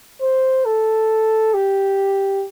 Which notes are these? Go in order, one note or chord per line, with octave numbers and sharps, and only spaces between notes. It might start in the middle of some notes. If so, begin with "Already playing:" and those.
C5
A4
G4